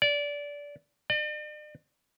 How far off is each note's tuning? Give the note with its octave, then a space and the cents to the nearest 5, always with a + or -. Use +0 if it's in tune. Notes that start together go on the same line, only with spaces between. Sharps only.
D5 -20
D5 +45